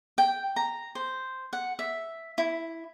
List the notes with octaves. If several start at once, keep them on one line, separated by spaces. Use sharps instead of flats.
G5
A#5
C5
F#5
E5
E4